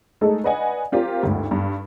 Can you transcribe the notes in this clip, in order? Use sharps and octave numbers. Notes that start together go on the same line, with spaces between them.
G#3 A3 D#4 G#4 A4
B4 D5 D#5 F#5 G#5
C4 F4 G4 A#4
G#1 D2 G2
G2